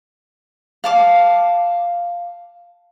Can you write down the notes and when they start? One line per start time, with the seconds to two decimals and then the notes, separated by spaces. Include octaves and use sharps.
0.84 F5 A5 D6